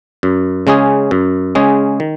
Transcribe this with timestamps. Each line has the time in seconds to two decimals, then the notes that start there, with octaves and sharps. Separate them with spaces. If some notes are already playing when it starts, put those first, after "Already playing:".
0.23 F#2
0.67 C#3 G#3 C#4 G#4
1.11 F#2
1.55 C#3 G#3 C#4 G#4
2.00 D#3